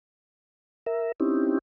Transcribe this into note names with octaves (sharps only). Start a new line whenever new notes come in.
A#4 E5
C4 C#4 D#4 E4 G4